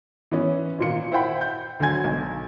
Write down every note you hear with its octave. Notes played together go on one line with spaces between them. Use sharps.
E3 B3 C#4
G#1 A#2 C#7
E4 C5 F#5 G5 B5
G6
D2 D3 F#3 G#5 G#6
B1